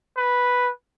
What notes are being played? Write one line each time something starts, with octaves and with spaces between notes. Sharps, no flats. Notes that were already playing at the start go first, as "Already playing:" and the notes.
B4